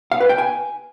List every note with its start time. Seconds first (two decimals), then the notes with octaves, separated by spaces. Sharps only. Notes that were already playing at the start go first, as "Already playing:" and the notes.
0.12 F5
0.20 B4
0.29 G5
0.38 G#5